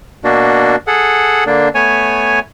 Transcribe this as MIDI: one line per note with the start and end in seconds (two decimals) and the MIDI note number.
0.24 0.76 47
0.24 0.76 58
0.24 0.76 62
0.24 0.76 66
0.87 1.44 68
0.87 1.44 69
0.87 1.44 78
1.47 1.69 50
1.47 1.69 58
1.47 1.69 62
1.75 2.39 57
1.75 2.39 59
1.75 2.39 73
1.75 2.39 80